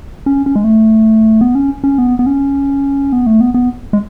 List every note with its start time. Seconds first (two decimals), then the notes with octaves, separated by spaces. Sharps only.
0.26 C#4
0.46 C#4
0.55 G#3
0.64 A3
1.41 B3
1.55 C#4
1.84 C#4
1.98 B3
2.19 B3
2.26 C#4
3.13 B3
3.26 A3
3.41 B3
3.54 B3
3.93 G#3